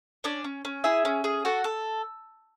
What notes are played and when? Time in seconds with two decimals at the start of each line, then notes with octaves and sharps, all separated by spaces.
0.24 C#4 D4 D5
0.44 C#4
0.65 C#4
0.84 E4 G#4 E5
1.05 C#4
1.24 G#4
1.45 F#4 A4 F#5
1.64 A4